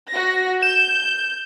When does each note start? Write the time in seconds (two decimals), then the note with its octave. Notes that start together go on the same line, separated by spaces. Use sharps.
0.12 F#4 A#6
0.62 G6 E7